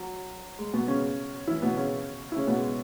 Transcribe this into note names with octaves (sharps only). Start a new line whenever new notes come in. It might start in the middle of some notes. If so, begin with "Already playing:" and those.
Already playing: F#3
G#3
B2 B3
C#3 C#4
E3 E4
B2 B3
C#3 C#4
E4
C#3 C#4
B2 B3
G#3